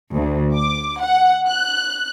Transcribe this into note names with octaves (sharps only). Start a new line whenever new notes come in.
D2
D6
F#5
F#6